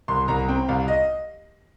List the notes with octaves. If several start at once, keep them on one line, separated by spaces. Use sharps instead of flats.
C2 C6
C2 A#5
C4 G5
C2 F5
D#5